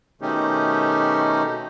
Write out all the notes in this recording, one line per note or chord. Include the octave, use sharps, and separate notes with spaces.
B2 D#3 A3 C#4 D#4 G4